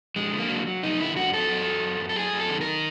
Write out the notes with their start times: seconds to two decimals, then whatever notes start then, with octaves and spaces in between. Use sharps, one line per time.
0.16 F2 G#3
0.33 D3
0.38 A#3
0.50 F#3
0.67 F#3
0.83 F2 D#4
1.00 D3 E4
1.16 F2 F#4
1.33 F#3 A4
1.50 F#2
1.66 F#3
1.82 F#2
1.99 F#2
2.09 A4
2.16 F#2 G#4
2.33 F#2
2.39 A4
2.49 D#3
2.61 A#4
2.66 D#3